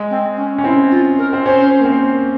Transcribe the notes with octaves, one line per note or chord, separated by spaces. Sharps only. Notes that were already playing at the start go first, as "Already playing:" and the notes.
Already playing: G#3
C4
C#4
C#4
C4 E4
F4
A#4
C4
C#4 C5
A#3
C4